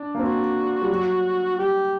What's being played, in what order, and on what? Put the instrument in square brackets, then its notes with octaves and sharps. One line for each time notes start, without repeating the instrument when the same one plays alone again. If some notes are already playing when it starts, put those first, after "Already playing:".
Already playing: [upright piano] D4
A#3
[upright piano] C4 [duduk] F#4
[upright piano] G3
F#3
[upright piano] G3 [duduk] G4